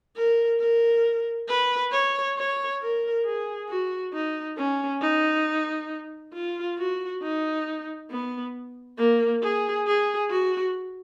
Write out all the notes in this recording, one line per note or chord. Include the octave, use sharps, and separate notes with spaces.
A#4
A#4
B4
C#5
C#5
A#4
G#4
F#4
D#4
C#4
D#4
F4
F#4
D#4
B3
A#3
G#4
G#4
F#4